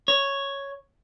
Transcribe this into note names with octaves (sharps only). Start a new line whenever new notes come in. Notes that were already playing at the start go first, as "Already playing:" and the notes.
C#5